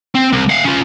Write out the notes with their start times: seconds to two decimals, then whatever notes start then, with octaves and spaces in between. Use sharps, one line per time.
0.15 C4
0.33 C2
0.50 F5 F#5
0.64 C#4 F4